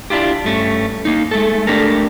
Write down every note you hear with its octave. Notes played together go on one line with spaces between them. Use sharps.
D4 E4 F4 G4
G2 A3 C#4
A#3 D#4
G#3 A3 A4
A3 D4 G4 A4 A#4